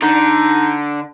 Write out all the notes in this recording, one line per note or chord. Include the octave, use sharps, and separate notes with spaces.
D3 D#4